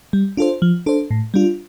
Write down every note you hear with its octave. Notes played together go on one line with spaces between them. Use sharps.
G3
D4 F4 A4 C5
F3
D4 A4 C5
A2
G3 D4 F4